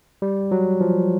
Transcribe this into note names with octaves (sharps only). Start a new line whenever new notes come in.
G3
F#3
F3